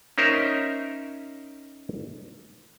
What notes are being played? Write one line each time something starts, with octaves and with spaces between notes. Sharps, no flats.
C#4 D#4 A#4 C5 E5